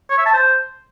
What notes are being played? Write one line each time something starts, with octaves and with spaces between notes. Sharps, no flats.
C#5
E5
A5
C5